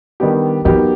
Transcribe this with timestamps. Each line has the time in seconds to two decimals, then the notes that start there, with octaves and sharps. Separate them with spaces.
0.20 D#3 G3 B3 D4 G4
0.64 E3 F#3 B3 D#4 G4 A#4